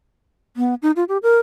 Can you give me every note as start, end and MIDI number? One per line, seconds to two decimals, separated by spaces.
0.57 0.75 59
0.82 0.91 63
0.96 1.04 65
1.09 1.17 67
1.23 1.40 70